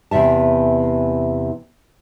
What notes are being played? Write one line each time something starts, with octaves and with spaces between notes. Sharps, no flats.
E2 C3 E3 E5 A5